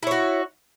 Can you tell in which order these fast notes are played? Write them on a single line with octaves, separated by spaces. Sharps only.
E4 C#5 F#4